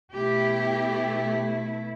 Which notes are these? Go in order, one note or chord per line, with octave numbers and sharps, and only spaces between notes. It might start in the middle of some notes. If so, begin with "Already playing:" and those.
B2 A3 E4 G4